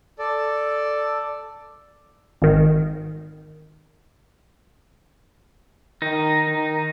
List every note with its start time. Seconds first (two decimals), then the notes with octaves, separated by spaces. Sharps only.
0.19 A4 D5
2.42 G#1 D#3
6.02 D#3 D#4
6.47 D#3